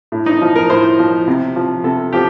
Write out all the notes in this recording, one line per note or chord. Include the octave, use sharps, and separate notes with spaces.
A2
D#4
F3
A#4
A2 C5
F3
C3
F3
C3 A4
F3 G4